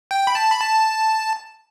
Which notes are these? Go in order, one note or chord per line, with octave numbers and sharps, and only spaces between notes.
G5
B5
A5
B5
A5